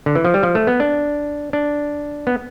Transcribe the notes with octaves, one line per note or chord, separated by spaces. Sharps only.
D3
E3
F3
G3
F3
A3
B3
D4
D4
B3